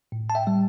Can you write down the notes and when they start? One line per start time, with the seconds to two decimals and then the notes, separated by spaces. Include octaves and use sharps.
0.12 A2
0.30 A5
0.35 E5 G5
0.47 G3